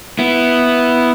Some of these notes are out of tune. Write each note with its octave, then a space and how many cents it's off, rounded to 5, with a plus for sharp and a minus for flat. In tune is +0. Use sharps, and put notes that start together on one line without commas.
B3 +0 E4 +0